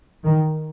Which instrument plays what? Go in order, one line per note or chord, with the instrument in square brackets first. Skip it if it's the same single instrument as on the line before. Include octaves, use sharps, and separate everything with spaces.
[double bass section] D#3